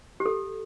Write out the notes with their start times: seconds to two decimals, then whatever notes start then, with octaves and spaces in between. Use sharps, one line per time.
0.20 G4
0.26 A4